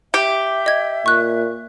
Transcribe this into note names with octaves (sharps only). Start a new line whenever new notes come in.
G4 E5
D#5 G#6
A#2 C#6 F#6